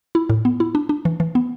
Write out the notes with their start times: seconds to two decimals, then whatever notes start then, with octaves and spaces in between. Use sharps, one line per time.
0.15 E4
0.30 A2
0.45 B3
0.60 E4
0.75 D4
0.89 D4
1.05 E3
1.20 E3
1.35 B3